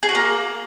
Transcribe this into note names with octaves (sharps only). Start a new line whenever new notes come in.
G#4
F#4
A#3